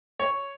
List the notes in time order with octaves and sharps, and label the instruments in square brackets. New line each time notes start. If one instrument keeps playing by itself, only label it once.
[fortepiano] C#5